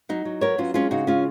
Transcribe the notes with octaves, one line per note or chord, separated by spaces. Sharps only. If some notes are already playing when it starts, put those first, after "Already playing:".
F#3 D#4
F#3
B3 A#4 C#5
F#3 C#4 F4
G#3 C#4 F4
C#3 D#4 F#4
G#3 C#4 F4